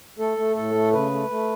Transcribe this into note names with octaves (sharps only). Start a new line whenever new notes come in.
A3 A4
A3
A2 A4
A3
C#3 B4
A3
A3